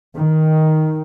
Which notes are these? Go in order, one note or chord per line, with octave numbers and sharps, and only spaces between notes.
D#3